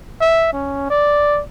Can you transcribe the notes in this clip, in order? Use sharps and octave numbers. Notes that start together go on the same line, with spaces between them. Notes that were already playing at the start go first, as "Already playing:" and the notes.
E5
C#4
D5